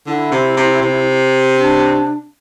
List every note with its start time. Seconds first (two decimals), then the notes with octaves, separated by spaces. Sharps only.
0.06 D3 E4
0.32 C3
0.57 C3
0.82 C3
1.56 D4